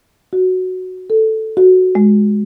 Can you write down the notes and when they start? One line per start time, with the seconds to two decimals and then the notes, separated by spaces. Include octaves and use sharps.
0.33 F#4
1.10 A4
1.57 F#4
1.95 G#3